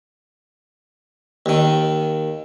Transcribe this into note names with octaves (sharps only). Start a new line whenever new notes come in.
D#2 D#3